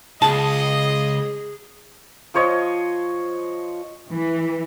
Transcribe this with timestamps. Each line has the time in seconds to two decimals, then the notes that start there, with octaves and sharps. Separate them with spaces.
0.22 C#2 G#4 D#5 A5
2.34 F3 C5 C#5 D#5
4.09 E3